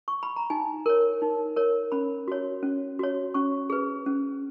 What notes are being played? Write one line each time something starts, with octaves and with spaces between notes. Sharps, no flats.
C#6
B5
A#5
D#4 G#5
A#4 C#5
D#4
A#4 C#5
C#4 B5
F#4 C#5
C#4
F#4 C#5
C#4 C#6
G#4 B4
C#4